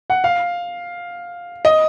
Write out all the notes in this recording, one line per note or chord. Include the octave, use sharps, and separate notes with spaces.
F#5
F5
D#5